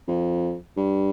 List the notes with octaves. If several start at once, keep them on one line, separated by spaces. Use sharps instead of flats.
F2
G2